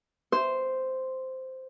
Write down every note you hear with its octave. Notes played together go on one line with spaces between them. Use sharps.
C5